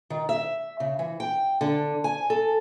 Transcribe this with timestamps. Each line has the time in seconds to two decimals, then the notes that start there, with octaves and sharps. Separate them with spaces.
0.10 D#3
0.29 E5
0.80 C#3
0.99 E3
1.20 G5
1.61 D3
2.04 G#5
2.30 A4